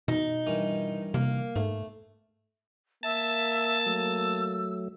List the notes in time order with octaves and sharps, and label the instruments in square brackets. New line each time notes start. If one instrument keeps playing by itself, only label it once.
[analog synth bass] B2 [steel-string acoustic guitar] D#4
[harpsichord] G2 D#3 E3
[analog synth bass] C3 [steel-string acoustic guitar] A#3
[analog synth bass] G#2 [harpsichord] A3
[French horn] A#3 [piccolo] E5 [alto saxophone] A5
[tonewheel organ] F#3 A3 [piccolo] E6